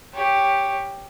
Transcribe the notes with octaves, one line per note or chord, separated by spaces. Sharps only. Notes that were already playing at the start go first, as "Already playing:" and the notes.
G4 C#5